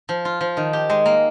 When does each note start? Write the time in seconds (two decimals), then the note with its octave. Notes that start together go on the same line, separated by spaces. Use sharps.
0.09 F3
0.25 F4
0.41 F3
0.57 D#3
0.73 G4
0.90 G#3
1.06 A#3